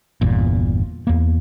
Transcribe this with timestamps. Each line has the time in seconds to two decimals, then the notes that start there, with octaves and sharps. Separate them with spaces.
0.21 G1 E2 A#2
1.07 E2 A#3